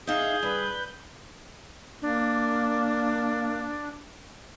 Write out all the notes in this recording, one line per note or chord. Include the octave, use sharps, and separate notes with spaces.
D#4 G#4 E5 F5 G6
G2 B4
A#3 D4